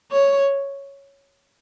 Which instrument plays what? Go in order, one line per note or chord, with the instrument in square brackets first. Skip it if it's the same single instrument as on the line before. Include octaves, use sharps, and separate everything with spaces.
[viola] C#5